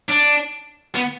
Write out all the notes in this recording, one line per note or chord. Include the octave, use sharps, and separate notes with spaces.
D4
B3